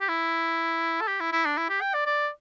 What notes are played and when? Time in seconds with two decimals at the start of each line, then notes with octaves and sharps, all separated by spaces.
0.01 G4
0.09 E4
1.01 A4
1.08 G4
1.20 E4
1.32 E4
1.45 D4
1.57 E4
1.69 G4
1.81 G5
1.94 D5
2.06 D5